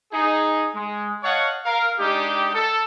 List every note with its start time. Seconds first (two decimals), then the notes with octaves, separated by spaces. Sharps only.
0.13 D#4 G#4
0.75 G#3
1.24 C#5 D#5 F5 F#5 A5 C#6
1.65 A#4 F5
1.99 G#3 D4 D#4 G4
2.54 A4